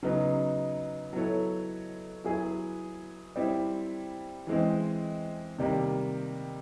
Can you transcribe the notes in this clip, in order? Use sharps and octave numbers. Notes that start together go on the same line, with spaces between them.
C#3 F#3 B3 D#4
F#3 B3 E4 A4 C#5
F#3 B3 E4 G#4
G3 C4 E4
E3 G#3 C4
C3 D#3 G3 A#3